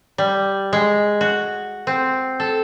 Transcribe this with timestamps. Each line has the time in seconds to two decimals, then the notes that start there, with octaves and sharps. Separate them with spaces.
0.18 G3
0.73 G#3
1.21 F#4
1.87 C4
2.40 A4